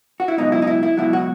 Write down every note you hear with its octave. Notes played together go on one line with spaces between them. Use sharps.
F#4
E4
C#2 B2 F#3 D#4
E4
D#4
E4
E4
C#2 B2 F#3 E4
F#4